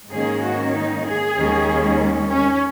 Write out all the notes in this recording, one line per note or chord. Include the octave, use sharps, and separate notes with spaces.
G#2 D#3 A#3 C#4 G#4
F#4
D#4
G#4
D#2 D#3 G#3 C#4
C#4